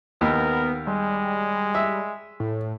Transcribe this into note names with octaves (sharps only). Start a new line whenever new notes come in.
D#2 B3 A#4
G3 G#3
E5
A2